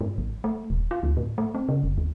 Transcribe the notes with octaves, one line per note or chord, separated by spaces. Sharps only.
G#2
A1
A3
D#1
F4
D2
A2
A3
C4
C#3
F#1
D#2